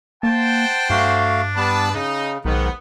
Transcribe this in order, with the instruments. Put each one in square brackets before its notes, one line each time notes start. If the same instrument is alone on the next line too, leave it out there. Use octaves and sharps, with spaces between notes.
[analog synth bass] A#3 [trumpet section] C5 F#5 G5 [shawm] A5
[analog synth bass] G2 [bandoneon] A3 F#4 F5 [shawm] D4
[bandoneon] G3 B3 D6 [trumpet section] B4 A5
[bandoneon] C#3 [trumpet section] D#4
[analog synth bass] B1 [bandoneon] G#2 D#3 [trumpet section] B3